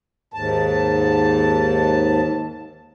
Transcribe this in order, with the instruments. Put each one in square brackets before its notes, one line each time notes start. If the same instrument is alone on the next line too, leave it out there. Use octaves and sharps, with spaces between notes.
[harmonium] D#2 G#2 A5